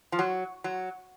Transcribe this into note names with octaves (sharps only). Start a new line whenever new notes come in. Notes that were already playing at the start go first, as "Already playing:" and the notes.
F3
F#3
F#3